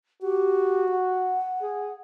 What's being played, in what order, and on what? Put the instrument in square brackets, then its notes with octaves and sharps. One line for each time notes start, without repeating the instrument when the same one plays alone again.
[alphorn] F#4 [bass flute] G4
[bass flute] F#5
[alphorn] G#4